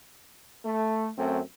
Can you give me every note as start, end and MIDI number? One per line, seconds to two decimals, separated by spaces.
0.65 1.10 57
1.18 1.40 42
1.18 1.40 57
1.18 1.40 60